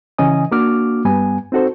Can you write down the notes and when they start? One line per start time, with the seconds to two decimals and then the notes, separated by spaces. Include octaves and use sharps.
0.18 C#3 E3 C#4 D#5 G#5 D#6
0.52 A#3 D4 F#4 D6 F6
1.05 G2 G3 B3 G#5
1.52 C4 D#4 F#4 A4 C5